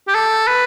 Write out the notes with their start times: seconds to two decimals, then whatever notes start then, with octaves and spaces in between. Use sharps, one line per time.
0.07 G4
0.14 A4
0.47 B4